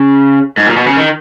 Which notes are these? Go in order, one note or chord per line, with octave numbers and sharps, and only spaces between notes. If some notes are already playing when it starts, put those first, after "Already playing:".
Already playing: C#3
G#2
A#2
B2
C#3
D#3